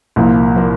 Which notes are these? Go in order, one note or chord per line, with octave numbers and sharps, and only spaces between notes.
C2 A#2 F3 A#3
A#2 F3 A#3